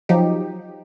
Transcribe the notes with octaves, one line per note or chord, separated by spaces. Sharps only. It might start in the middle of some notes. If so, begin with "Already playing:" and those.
F3 F#3 D#4 G4